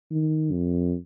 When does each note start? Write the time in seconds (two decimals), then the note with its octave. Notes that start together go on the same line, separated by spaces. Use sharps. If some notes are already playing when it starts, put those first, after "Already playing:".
0.11 D#3
0.52 F2